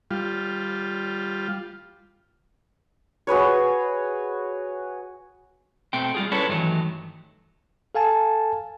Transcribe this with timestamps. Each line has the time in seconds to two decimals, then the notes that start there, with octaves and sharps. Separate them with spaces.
0.11 G3 F4
3.27 F#4 G#4 B4 C#5
5.93 B2 A3 C4 G5
6.15 G3 F4 G#4
6.32 C#4 D4 E4 A4 B4 C#5
6.48 G2 D#3 E3 F#3 A3
7.95 A4 F5 G#5 A5